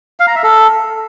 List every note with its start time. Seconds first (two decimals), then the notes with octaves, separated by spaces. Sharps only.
0.20 F5
0.27 A#5
0.35 E5
0.43 A4